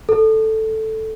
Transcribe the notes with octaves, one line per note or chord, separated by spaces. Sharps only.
A4